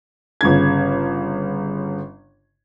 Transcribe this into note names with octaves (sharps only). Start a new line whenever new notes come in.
G1 C#3 G#6